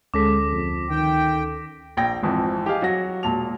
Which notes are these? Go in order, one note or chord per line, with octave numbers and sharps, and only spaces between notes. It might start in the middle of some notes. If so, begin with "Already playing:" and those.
D2 G#3 C#4 A4 D6 A#6 B6
F2
D#3 G5
A#1 G5 A#6
G#1 F2 E3 F3
G4 G#4 D#5 F5
F#3 F#4 A#6
E1 A#2 A5 F7